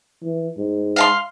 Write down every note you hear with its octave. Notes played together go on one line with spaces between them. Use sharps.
E3
G#2
F5 A5 C6